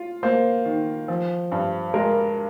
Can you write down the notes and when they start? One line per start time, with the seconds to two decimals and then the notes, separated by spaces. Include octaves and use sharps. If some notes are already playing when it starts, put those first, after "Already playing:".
Already playing: F4
0.23 A#3 C5
0.65 D#3
1.08 F3
1.52 G2
1.94 G#3 A#4